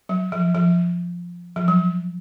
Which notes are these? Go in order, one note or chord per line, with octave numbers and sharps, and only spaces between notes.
F#3
F3
F3
F3
F#3